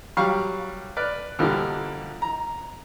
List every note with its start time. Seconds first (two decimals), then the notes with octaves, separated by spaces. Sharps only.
0.17 F#3 G3 F5 C#6
0.97 B4 D5 F6
1.39 B2 D3 E3 F3 G3 A#3
2.22 A#5